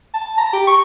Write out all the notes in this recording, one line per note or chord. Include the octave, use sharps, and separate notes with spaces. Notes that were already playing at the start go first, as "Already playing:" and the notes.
A5
A#5
G4
C#6